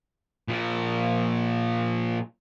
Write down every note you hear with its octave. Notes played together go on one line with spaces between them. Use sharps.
A#2 F3